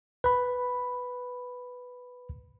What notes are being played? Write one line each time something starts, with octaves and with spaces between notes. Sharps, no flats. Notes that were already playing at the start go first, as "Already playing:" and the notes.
B4 B5